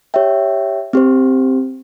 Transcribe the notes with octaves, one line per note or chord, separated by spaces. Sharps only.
G4 C#5 E5 G5
C4 G4 C5